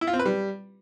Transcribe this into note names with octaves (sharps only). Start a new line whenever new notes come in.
E4
F4
C4
B4
G3